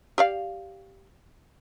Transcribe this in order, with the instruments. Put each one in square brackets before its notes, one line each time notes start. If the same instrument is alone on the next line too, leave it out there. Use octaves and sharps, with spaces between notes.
[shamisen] G4 D5 F5